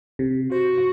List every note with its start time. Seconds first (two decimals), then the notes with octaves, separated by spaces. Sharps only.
0.19 C3
0.52 F#4 C5